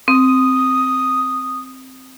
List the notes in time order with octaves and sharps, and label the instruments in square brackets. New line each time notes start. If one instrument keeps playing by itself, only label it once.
[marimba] C4 [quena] D#6